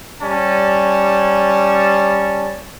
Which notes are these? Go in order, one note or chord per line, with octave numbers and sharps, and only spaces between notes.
G3 C#4 A5